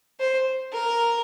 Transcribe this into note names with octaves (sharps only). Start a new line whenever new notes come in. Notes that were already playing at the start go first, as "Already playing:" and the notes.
C5
A#4